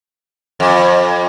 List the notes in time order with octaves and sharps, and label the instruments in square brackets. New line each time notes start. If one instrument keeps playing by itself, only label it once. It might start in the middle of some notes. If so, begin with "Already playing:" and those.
[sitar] F2